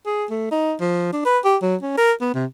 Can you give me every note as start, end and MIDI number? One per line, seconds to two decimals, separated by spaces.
0.06 0.26 68
0.30 0.50 57
0.51 0.74 63
0.80 1.09 53
1.13 1.24 62
1.25 1.39 71
1.44 1.57 67
1.62 1.76 54
1.82 1.93 61
1.97 2.12 70
2.21 2.32 59
2.34 2.45 48